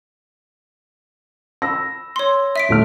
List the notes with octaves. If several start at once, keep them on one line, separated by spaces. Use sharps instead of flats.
B5 E6 A#6
C#5 C6
E5 B6 D7
D#1 A3 F6